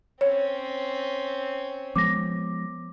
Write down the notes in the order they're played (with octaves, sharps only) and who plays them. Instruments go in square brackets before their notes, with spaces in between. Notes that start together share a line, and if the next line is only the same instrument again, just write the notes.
[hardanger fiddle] C4 C#4 [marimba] C#5
[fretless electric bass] F3 G#3 B3 [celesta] D6 A#6